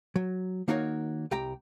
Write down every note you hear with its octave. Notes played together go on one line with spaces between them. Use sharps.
F#3
D#3 A#3 D#4 F#4 A#4 C#5
C2 G4 G5 A#5